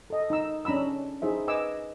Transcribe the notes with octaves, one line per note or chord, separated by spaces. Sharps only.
A4 D#5
D#4 A#5 E6
C#4 D4 A#5 B5 E6
D#4 E4 G#4 C5 E5
B4 D#5 G#5 D6 E6